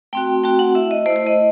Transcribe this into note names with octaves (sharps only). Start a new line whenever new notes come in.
A3 C4 F#4 G5
A3 C4 F#4 G5
F#5
A3 E4 E5
D#5
A3 E4 C5
C5
D#5